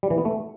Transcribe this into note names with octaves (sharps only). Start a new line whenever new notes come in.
G3
E3
B3
A3